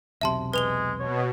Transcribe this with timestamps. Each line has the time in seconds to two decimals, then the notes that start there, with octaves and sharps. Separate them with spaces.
0.21 E1 B1 C3 E5 A5 C6
0.53 G#3 B4 F7 G7
1.00 B2 C#5